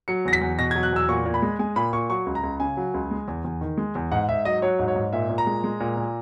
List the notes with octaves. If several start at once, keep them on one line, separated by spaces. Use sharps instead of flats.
F#3 C#7
E2 A#6
B6
E2
B2 A#6
G#6
F#3
F#6
E2 E6
A#2 C#6
A#2
B5
G#3
G#3 G#5
A#2 B5
A#2 C#6
F#3 C#6
C#2
A#5
C#2
C#3 G#5
F#3
C#2
G#3
E2
E2
D#3
G#3
E2
G#2 F#5
G#2 E5
F#3 D#5
F#3 C#5
G#2
C#5
G#2
A#2 E5
A#2
A#5
G#3
G#3
A#2
A#2